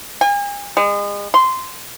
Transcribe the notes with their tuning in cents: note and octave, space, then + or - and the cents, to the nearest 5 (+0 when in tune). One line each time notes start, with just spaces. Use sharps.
G#5 -40
G#3 -35
C6 -10